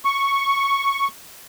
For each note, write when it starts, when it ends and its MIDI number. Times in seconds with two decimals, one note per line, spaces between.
0.05 1.08 85